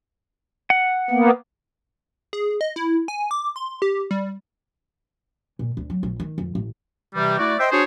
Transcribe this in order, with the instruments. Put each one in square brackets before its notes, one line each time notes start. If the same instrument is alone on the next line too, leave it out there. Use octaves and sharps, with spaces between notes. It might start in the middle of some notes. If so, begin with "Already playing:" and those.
[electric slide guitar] F#5
[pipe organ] A#3 B3
[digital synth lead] G#4
D#5
E4
G#5
D6
C6
G4
G3
[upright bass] A#2
D2
F#3
A#1
D#3
F2
A1
[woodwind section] C3 E3 G3
A3 E4 F#4 D5
C5 D#5 E5 G5 C6
D4 F#4 G#4 C5 C#5